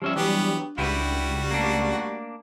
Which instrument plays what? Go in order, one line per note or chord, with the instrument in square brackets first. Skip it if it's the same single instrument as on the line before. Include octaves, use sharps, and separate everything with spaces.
[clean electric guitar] F3 C#4 E5 [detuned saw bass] G3 [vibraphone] E6
[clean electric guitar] E3 F#3 [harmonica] B3 G4 [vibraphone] D4
[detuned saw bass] C#2 [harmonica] G3 F#4 [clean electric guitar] E4 G4 B4
[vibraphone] A3 D5 [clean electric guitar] A#3 D4